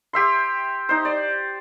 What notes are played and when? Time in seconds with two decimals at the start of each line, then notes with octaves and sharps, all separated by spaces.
0.13 G4 E5 C6
0.89 D#4 C5
1.05 D5